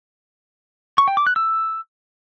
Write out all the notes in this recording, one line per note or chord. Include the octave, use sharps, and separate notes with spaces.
C#6
G5
D6
F#6
E6